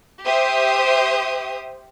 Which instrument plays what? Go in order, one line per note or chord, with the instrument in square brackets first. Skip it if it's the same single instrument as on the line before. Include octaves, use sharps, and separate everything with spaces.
[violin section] G4 C5 E5 D#6